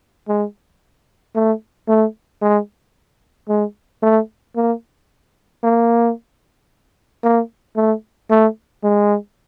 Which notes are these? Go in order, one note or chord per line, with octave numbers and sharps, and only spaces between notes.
G#3
A3
A3
G#3
G#3
A3
A#3
A#3
A#3
A3
A3
G#3